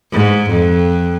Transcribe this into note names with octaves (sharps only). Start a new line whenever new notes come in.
G#2
F2